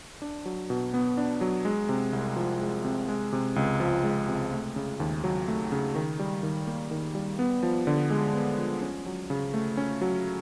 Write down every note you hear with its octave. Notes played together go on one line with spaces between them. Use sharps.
D4
F#3
B2
B3
D4
F#3
G#3
C3
C2
F3
G#3
C3
G#3
C3
C#2
F3
G#3
C3
A3
C#3
D#2
F#3
A3
C#3
D#3
G3
D#3
A#3
D#3
G3
B3
F3
D3
G#3
B3
F3
C#4
F#3
C#3
A3
C#4
F#3